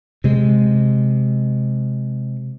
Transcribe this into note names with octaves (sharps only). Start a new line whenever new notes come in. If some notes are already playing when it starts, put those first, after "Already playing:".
C3 G#3